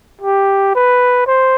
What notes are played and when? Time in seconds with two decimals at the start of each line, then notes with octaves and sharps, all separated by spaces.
0.21 G4
0.75 B4
1.27 C5